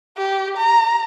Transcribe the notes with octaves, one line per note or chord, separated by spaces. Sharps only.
G4
A#5